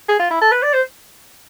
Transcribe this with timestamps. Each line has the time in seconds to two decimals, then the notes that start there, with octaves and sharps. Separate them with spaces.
0.09 G#4
0.19 F4
0.30 E4
0.42 A4
0.52 B4
0.62 D5
0.73 C5